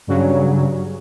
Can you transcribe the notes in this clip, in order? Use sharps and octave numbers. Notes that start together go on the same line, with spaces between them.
G2 C#3 F#3